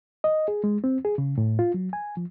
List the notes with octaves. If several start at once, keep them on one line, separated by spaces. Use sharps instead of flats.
D#5
G#4
G#3
C4
G#4
C#3
A2
F4
F#3
G#5
F3